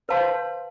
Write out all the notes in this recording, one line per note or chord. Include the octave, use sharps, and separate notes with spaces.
B4 C5 F5 A5 C6